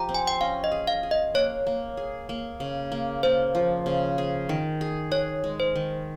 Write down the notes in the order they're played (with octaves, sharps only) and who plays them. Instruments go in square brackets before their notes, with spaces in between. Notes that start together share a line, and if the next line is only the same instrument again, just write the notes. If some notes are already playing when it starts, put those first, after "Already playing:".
Already playing: [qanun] F3 G4 [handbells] A#5
[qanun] C4
[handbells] G#5
G5
[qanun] C#4 [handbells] F5
[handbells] D#5
[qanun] G#4
[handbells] F5
[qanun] G#4
[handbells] D#5
[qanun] A#3 [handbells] C#5
[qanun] A#3
G#4
A#3
C#3
A#3
[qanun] A#3 [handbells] C5
[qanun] F3
C#3
G#4
D#3
G#4
[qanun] G#4 [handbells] C#5
[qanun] G#3
[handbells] C5
[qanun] D#3